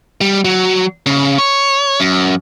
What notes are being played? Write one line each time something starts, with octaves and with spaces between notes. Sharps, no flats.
G3
F#3
C#3
C#5
F#2